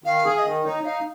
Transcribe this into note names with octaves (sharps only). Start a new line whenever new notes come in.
D#3 F5
G#4
F5
D#5
D#3
D#4 C#5
D#4 F5